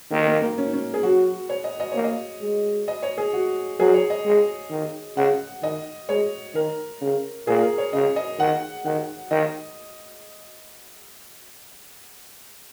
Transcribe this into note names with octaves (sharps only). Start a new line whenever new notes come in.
D#3 A#3
A#3
A#3
C#4
D#4
C#4
G#4
F#3 F#4
C#5
D#5
D#5
A#3 C#5
D#5
G#3
D#5
C#5
G#4
F#4
F#3 G#4
C#5
D#5
G#3
D#3
C#3 F#5
D#3 D#5
G#3 C#5
D#3 A#4
C#3
A#2 G#4
A#4
C#5
C#3 D#5
D#5
D#3 F#5
D#3 F#5
D#3 D#5